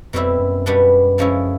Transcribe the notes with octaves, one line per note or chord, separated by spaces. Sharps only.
F2 B2 G3 C4 E4
F#2
B2 G3 B3 D4
C#3 F3 G#3 C#4 E4